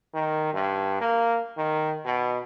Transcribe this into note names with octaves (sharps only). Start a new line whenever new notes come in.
D#3
G2
A#3
D#3
B2